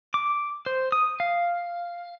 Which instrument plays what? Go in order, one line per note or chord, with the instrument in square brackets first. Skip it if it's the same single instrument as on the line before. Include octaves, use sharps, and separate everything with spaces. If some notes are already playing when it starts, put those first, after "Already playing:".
[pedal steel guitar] D6
C5
D#6
F5